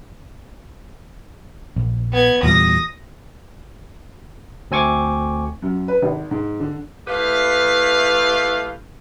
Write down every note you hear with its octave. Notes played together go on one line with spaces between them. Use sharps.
A#1
B3 G#6
E2 A#2 G3 D#6 A#6
D2 C4 G#5 C#6 D6
F#2
B4
G#1
G#2
D3
A3 E4 G4 B4 F5